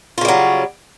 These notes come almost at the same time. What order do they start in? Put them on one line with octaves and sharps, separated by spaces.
F4 C#3 G3 F#3